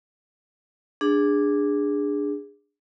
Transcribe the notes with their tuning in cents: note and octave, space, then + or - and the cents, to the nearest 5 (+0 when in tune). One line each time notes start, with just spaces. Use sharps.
D4 +0 G#4 -15